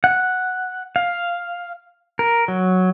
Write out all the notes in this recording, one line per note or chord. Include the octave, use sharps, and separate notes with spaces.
F#5
F5
A#4
F#3